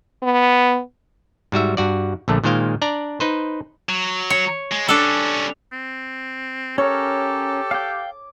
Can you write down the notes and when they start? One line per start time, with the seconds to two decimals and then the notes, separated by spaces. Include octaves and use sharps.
0.23 B3
1.52 G#2 G3 F#4 E5
1.77 G2 F#4 D5
2.28 A#1 D3 A3
2.44 A#2 D#3 G#3 C5 F5 G5
2.82 D4 D5 A#5
3.20 D#4 B4 C5
3.89 F#3
4.30 C#5
4.72 G#3
4.88 G3 C#4 D4 A4
5.72 C4
6.78 C#4 G4 A4 A#4 C#5
7.71 F5 G5 D6